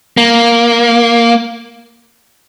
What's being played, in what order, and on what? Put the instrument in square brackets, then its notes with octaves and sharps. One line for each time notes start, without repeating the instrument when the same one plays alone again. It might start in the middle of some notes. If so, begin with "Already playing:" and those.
[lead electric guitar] A#3